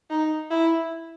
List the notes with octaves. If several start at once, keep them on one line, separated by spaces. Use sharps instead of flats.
D#4
E4